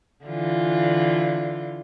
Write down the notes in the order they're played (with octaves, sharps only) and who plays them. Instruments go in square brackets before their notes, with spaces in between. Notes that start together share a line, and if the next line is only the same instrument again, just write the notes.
[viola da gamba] D3 E3 F4